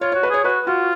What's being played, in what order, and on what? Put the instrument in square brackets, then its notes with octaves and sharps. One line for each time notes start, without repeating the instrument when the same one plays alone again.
[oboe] F4 [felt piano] C#5
[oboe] F#4 [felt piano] C#5
[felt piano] B4
[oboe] G#4 [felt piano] C#5
[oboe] F#4 [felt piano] B4
[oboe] F4 [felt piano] F#4